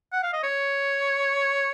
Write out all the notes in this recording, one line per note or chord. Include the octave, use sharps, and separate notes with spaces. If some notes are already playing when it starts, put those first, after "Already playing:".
F#5
F5
D#5
C#5